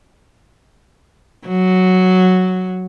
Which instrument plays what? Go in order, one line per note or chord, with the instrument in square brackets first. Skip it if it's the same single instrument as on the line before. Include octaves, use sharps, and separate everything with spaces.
[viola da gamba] F#3